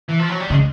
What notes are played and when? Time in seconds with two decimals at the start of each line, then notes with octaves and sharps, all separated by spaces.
0.09 E3
0.19 F3
0.29 F#3
0.40 G3
0.50 C#3 G#3